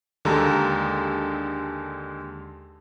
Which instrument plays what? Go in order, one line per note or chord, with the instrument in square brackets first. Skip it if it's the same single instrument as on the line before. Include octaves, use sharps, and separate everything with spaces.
[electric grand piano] D#2 D3 G#3 G4 A4 A#5